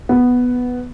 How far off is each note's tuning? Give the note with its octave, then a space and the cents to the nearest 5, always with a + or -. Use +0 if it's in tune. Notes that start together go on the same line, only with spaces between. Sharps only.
B3 +0